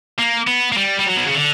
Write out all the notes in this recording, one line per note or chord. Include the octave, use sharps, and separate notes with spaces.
A#3
B3
A#3
G3
G3
F#3
B2
C#3
D3